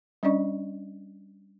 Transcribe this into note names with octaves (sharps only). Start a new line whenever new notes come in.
G3 C#4 D4 D5 D#5 C#6